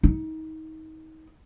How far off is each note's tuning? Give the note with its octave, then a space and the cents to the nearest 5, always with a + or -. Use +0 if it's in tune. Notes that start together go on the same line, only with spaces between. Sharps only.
D#4 +30